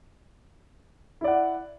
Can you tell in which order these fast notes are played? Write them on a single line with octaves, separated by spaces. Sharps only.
E4 D5 F#5